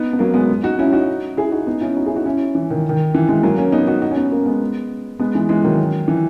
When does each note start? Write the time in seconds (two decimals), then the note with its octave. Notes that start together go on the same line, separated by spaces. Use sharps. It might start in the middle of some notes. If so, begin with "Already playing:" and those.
Already playing: B3 D#4
0.13 B3
0.19 F#3 A#3
0.34 G#3 B3
0.63 D#4 F#4
0.79 C#4 E4
0.93 D#4 F#4
1.37 E4 G#4
1.52 D#4 F#4
1.67 B3 D#4
1.81 C#4 E4
1.96 D#4 F#4
2.06 E4 G#4
2.16 D#4 F#4
2.26 C#4 E4
2.55 E3
2.70 D#3
2.89 D#3
3.14 E3
3.29 E3 G#3
3.43 F#3 A#3
3.58 A#3 C#4
3.72 B3 D#4
3.87 D#4 F#4
4.02 D#4 F#4
4.11 C#4
4.17 B3 D#4
4.31 A#3 C#4
4.46 G#3 B3
5.19 G#3 B3
5.34 E3 G#3
5.49 E3 G#3
5.64 D#3 F#3
6.08 E3